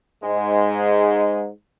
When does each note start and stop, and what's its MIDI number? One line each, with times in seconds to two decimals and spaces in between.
0.24 1.48 44
0.24 1.48 56